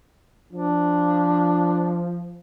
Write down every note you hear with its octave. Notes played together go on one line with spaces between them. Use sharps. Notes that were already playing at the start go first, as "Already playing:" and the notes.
F3 D4